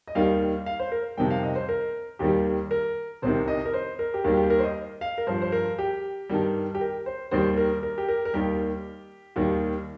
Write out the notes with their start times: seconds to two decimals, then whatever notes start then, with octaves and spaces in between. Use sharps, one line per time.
0.08 D#5
0.15 D#2 D#3 G3 F5
0.66 F5
0.79 C5
0.92 A#4
1.17 F2 C3 D#3 G3 G5
1.30 F5
1.43 D#5
1.56 C5
1.69 A#4
2.19 D#2 D#3 G3 G4
2.71 A#4
3.22 C2 C3 D#3 C5
3.48 D#5
3.66 A#4
3.74 C5
3.99 A#4
4.14 G4
4.24 D#2 D#3 G3 A#4
4.37 G4
4.50 A#4
4.59 C5
4.63 D#5
5.01 F5
5.18 A#4
5.27 G2 F3 C5
5.42 C5
5.52 A#4
5.79 G4
6.29 G2 D#3 G3
6.75 G4
6.81 A#4
7.06 C5
7.31 D#2 D#3 G3 C5
7.57 A#4
7.83 A#4
7.98 G4
8.08 A#4
8.25 A#4
8.34 D#2 D#3 G3 G4
9.36 D#2 D#3 G3